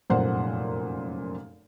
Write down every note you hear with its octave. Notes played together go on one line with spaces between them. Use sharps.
F1 F#2 A#2 C5 F#5